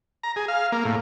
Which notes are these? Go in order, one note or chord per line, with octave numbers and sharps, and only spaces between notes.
A#5
G#4
F5
A#3
A2